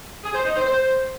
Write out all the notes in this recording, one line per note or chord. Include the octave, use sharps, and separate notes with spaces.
G#4
C5
D#4
C5
C5